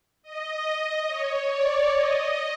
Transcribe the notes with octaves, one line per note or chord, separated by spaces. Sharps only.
D#5
C#5
D5
D#5